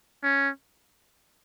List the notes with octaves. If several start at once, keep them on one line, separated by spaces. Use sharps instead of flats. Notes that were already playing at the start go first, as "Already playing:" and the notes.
C#4